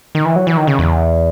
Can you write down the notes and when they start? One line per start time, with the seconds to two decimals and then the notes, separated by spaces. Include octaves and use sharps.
0.15 D#3
0.25 E3
0.36 F#3
0.47 E3
0.57 D#3
0.67 C#3
0.79 E2